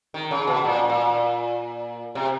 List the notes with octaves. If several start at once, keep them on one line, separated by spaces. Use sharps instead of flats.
D#3
C#3
B2
A#2
A#2
C3